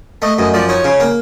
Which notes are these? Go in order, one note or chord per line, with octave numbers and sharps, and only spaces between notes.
A3 D#5
F#2 D#5
F3 D5
D#4 C#5
C#3
A#3